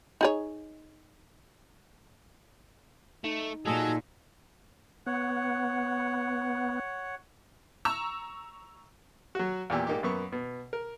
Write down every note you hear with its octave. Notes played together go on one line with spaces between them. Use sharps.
D#4 G#4 C#5
A3 D#4
A#2 F#3 G#4 A4 D#5
B3 C#5 F#5
A#5 C#6 E6
F#3 F#4
E2 A#2 G4 E6
G#2 A#3 D#4 G4
F#2 A#3 B3 C#6
B2
A#4